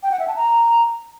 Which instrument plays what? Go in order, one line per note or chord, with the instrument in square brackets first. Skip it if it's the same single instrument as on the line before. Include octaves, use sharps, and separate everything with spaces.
[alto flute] G5
F#5
E5
A5
A#5